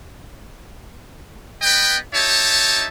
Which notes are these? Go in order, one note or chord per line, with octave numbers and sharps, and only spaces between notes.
B3 B4 D#5 G5
D#4 G4 C#5 E5 A5